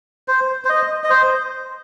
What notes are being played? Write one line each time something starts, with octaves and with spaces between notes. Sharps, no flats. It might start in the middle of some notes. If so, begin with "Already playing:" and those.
C5
C5
D#5
D#5
C5